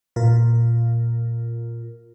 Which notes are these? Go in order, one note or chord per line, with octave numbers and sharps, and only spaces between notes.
A#2 F4 A#4